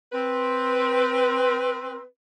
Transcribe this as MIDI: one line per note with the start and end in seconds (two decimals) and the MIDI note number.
0.13 2.01 60
0.13 2.01 71